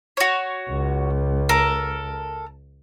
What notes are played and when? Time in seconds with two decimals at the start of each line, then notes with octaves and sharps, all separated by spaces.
0.17 F#4 C#5
0.69 C#2
1.49 A4 A#4